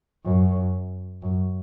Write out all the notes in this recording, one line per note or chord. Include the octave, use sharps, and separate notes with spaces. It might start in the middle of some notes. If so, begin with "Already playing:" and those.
F#2
F#2